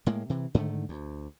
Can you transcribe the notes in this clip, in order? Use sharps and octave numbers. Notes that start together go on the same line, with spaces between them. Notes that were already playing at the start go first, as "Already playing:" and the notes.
A2 G#3 A#3
C3 E3
G#2 D3 D#3 A3
D2